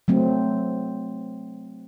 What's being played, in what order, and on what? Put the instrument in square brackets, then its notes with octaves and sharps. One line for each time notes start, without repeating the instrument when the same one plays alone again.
[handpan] F#3 A3 C4